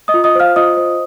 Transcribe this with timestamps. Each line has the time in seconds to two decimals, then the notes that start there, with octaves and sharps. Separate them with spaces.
0.08 D#5 D#6
0.14 F4
0.24 D#5 D#6
0.35 C5 F5 F6
0.56 F4 D#5 D#6
0.77 C5